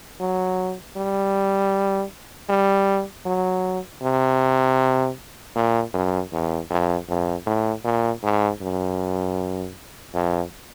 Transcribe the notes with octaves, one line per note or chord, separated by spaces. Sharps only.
F#3
G3
G3
F#3
C3
A#2
F#2
E2
F2
F2
A2
A#2
G#2
F#2
F2